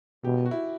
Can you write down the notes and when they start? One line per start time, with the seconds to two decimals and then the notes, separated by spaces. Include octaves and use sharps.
0.24 B2 G4
0.46 F#4
0.51 E4